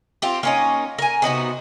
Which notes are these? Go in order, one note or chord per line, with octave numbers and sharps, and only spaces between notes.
C4 F4 G4
A#3 C#4 D#4
A#4 G#5
C3 B3 D#4 F#4